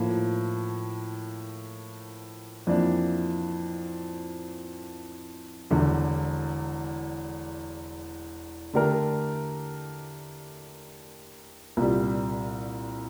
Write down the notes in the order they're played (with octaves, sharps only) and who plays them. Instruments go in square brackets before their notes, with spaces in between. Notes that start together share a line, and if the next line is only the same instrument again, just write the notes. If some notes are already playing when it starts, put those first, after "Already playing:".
Already playing: [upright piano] A2 F3 A#3
F2 E3 A#3 D4
E1 E2 D3
D3 A3 D4 G4 A#4
C2 A#2 G3